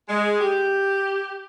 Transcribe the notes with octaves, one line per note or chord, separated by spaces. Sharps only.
G#3
G4